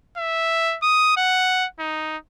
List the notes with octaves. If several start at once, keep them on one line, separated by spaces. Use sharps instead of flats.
E5
D#6
F#5
D#4